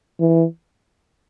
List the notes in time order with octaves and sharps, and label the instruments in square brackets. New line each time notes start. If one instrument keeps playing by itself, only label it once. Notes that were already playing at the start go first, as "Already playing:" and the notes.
[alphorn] E3